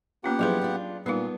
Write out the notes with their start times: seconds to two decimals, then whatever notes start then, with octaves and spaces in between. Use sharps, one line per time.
0.24 A#3 B3 C#4 F4 G4 F#5
0.39 F3 F#3 E4 F4 G#4 B4
0.61 D4 F4
1.06 A#2 G3 B3 D4 D#4 F4